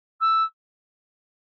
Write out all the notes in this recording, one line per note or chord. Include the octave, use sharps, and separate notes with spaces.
E6